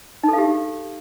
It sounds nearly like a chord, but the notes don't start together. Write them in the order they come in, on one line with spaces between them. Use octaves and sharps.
D#4 A4 F5 G4